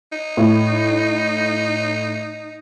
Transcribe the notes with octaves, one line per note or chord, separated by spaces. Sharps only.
D#4
A2